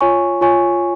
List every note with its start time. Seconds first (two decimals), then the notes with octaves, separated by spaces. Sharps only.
0.01 F4 C#5 G#5 C#6
0.41 F4 C#5 G#5 C#6